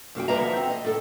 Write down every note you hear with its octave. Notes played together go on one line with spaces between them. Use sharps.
F#2 A#3 F#4 G5
G2 A#3 B4 D#5 E5 A#5
D2 F3 E5 F#5
C4
D#5
A2 A4